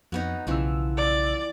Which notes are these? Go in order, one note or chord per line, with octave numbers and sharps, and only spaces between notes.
F2 F#3 B3 D#4
B1 C#3 E3 F3 B3 E6
D5